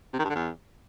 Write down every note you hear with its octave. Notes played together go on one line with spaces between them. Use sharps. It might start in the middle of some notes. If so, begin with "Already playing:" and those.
C3
D#3
G2
D3
E2